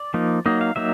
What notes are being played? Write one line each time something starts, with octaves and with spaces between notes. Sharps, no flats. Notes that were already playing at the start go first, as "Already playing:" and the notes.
Already playing: D5
F3 A#3 D#4
F#3 A#3 D#4 D#5
F5
F#3 A#3 D#4 E5